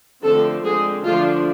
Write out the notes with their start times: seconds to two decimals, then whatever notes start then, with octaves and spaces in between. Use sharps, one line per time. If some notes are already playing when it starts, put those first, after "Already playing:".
0.23 D3 F3 A3 C4 A4
0.64 D3 G#3 C4 G#4
1.04 D3 F3 A3 D4 F4